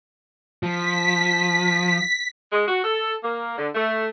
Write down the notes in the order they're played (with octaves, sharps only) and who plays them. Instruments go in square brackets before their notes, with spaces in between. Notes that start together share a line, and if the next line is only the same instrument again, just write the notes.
[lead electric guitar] F3 [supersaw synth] B6
[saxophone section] G#3
F#4
A4
A#3
D3
A3